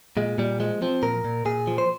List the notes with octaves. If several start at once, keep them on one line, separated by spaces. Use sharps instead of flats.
A#2 G#3
A#2 G3
F3 G#3
F3 C4
A#2 A#4
A#2
A#2 G#4
F3
C5